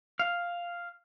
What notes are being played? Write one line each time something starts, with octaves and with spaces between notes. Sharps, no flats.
F5